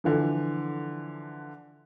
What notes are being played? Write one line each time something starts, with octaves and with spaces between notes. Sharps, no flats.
D3 E3 F3